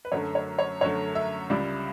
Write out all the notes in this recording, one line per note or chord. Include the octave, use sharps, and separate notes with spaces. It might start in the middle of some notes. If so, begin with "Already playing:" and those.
B4
F#2 D3 F#3 A3 C#5
C#5
C#5
F#2 D3 F#3 A3 C#5
E5
C#2 C#3 G3 D5